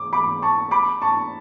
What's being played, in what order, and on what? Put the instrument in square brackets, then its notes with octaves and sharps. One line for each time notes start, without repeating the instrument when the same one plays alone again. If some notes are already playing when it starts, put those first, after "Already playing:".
Already playing: [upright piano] D6
B5 D6
A5 C#6
B5 D6
A5 C#6